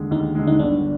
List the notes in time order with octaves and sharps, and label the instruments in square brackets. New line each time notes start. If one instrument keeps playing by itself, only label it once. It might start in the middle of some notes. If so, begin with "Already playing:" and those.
Already playing: [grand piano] D#2 D3 G#3
[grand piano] D#2 [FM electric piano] D#4
[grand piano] D3 G#3
[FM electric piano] D#4
[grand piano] G1 [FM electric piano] D4